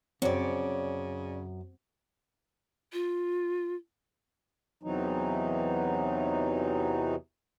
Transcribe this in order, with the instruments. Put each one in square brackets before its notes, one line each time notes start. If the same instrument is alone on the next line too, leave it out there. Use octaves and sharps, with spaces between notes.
[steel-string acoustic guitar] F#2 [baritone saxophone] C#3 [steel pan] C4 [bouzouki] C#5 D5
[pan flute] F4
[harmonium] E2 C3 E3 F#3 D#4